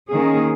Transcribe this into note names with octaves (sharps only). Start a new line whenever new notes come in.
D#3 A#3 C#4 G#4